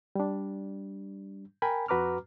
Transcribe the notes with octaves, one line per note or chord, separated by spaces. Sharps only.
G3 D4
A#4 G5 G#5 B5
F2 F#4 B4 A#5 D6 F6